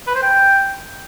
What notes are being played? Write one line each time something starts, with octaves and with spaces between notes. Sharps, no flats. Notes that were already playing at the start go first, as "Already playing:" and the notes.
B4
C5
G5